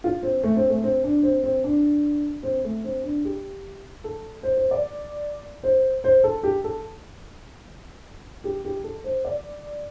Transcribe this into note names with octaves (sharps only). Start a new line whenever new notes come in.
F4
C4
A3
C4
A3
C4
D4
C4
C4
D4
C4
A3
C4
D4
G4
A4
C5
C5
D5
C5
C5
A4
G4
A4
G4
G4
A4
C5
D5